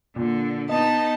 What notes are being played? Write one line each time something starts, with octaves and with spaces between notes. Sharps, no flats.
A#2 D3
B3 D#4 D#5 A5